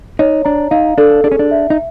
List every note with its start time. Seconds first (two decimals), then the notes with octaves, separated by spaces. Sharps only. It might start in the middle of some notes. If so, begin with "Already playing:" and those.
0.19 D#4 C#5
0.45 D4 A#5
0.71 D#4 F5
0.98 D4 A4
1.24 D4 G#4
1.32 C#4
1.39 D4
1.51 E5
1.70 D#4